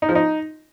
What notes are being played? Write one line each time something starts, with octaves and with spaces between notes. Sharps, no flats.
D#4
F3
D#4